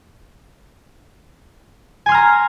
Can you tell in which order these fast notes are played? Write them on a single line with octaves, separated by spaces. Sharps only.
G#5 C6 F6 A#5